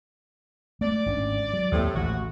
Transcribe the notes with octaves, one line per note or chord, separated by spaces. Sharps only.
A3 D5
G#1 C#4 D4
F#3
D#2 A2 C3 A3 A#3
A1 D#3 A3 F#4